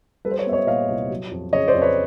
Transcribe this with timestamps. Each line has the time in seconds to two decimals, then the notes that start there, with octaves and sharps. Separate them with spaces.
0.25 G3 A4 B4
0.31 C5
0.38 B4 C#5
0.46 B3 E5
0.53 C#5 D#5
0.67 A#2 D#5 F5
0.88 C2
1.10 F#3
1.31 F2
1.53 C#3 C#5 D#5
1.68 C5 D5
1.75 F2
1.82 B4 C#5